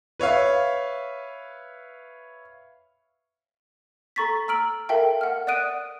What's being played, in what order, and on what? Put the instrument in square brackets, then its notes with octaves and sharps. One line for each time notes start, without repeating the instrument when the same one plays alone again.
[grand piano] B4 C#5 E5 F5
[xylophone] A4 A#5 C#6 A6 B6
A#5 E6 F6 D7 F#7
A4 A#4 E5 F5 G5 A5
F#5 F6
D5 F#5 D#6 F#6 D7 D#7